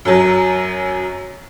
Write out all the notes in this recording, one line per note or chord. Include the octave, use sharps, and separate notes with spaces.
F#2 F#3